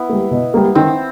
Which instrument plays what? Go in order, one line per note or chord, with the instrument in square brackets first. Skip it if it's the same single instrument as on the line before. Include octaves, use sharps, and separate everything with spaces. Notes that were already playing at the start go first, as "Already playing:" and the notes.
Already playing: [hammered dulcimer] B3 E4
[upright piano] G3 A#3
B2
G3 A#3
[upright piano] D#3 [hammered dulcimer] C4